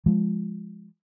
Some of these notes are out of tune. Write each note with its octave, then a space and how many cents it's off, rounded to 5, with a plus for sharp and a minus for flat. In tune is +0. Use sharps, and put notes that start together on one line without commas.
F3 +0 G#3 +0